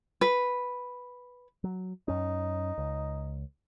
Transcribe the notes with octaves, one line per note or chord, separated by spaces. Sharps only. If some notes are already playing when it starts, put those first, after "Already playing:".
B4
F#3
F#2 C#4 D#4
C#2